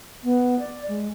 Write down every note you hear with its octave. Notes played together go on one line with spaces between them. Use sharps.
B3
D5
G#3